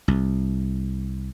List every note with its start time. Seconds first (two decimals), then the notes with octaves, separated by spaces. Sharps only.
0.08 C2